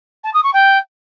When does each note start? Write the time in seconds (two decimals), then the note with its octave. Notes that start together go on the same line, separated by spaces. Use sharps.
0.24 A5
0.34 D#6
0.43 C#6
0.53 G5